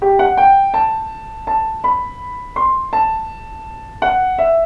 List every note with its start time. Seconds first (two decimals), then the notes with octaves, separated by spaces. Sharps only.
0.02 G4
0.19 F#5
0.37 G5
0.74 A5
1.47 A5
1.84 B5
2.56 C6
2.93 A5
4.02 F#5
4.38 E5